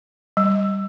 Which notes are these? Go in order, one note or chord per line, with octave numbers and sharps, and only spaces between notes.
G3